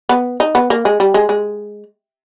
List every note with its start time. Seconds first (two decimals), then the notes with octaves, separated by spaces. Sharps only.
0.09 B3
0.40 D#4
0.55 B3
0.70 A#3
0.85 G#3
1.00 G3
1.14 G#3
1.29 G#3